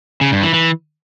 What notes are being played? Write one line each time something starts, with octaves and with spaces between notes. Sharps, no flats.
C#3
G2
E3
E3